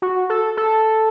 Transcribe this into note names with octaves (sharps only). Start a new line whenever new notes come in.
F#4
A4
A4